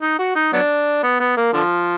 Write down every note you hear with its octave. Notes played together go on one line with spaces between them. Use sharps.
D#4
F#4
D#4
F#3 B3 D4
B3
B3
A#3
D3 F3